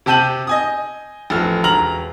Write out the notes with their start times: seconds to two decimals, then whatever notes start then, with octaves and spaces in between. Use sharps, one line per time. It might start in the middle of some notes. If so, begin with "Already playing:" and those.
0.06 C3 G4 A5 G6 D#7 F#7
0.47 D#5 G#5 D#6
1.30 A1 F2 A4 F6
1.64 E1 A#5 F6 F#7